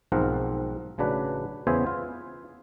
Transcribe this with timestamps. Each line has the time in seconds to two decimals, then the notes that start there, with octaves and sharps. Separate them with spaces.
0.12 B1 G#2 F3 C4 A#4 F#5
0.98 A1 C#3 F#3 D4 B4
1.67 E2 C#3 B3 C5 E5 G#5
1.87 F4